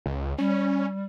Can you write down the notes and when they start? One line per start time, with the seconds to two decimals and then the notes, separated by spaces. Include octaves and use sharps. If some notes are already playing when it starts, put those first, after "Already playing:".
0.06 C#2
0.38 G3 C#4